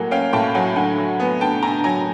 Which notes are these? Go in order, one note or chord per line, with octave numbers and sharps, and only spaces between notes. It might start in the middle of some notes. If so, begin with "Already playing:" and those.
Already playing: A2 F#3 A#3 F#5 G#5
C#4 F5 G5
A2 G5 A5
F#3 F#5 G#5
D3 F#5 G#5
F#3
B3
D3 G5 A5
D3 G#5 A#5
F#3 G#5 A#5